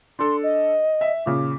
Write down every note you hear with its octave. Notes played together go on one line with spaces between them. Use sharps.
D4 A4 C6
D#5
E5
A#2 C#3 D6